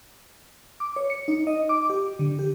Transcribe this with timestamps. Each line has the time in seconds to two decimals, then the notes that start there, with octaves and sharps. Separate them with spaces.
0.80 D6
0.96 C#5
1.10 C#7
1.28 D#4
1.47 D#5
1.69 D6
1.90 G4
2.19 D3
2.39 G4